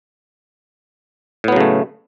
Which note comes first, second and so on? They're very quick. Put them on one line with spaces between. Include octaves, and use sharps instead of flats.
A2 B3 F#3 C#3 A3